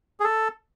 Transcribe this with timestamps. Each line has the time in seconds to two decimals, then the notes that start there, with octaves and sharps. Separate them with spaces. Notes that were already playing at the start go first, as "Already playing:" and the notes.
0.20 G#4
0.24 A4